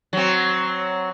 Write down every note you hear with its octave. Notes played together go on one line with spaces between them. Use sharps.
F#3 C4